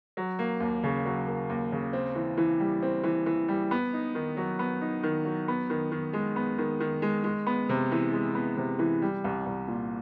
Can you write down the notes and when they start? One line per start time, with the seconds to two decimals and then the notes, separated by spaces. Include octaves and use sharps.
0.17 F#3
0.39 A#3
0.60 D#2
0.83 C#3
1.05 F#3
1.27 A#3
1.49 D#2
1.72 C#3
1.93 C4
2.16 E3
2.38 E3
2.60 G3
2.82 C4
3.04 E3
3.26 E3
3.48 G3
3.71 B3
3.93 D#4
4.15 D#3
4.37 F#3
4.59 B3
4.81 D#4
5.03 D#3
5.25 F#3
5.48 B3
5.70 D#3
5.92 D#3
6.13 G#3
6.36 B3
6.58 D#3
6.80 D#3
7.02 G#3
7.24 G#3
7.47 B3
7.69 C3
7.92 E3
8.13 G#3
8.35 B3
8.57 C3
8.79 E3
9.02 G3
9.24 C2
9.46 C2
9.67 A#2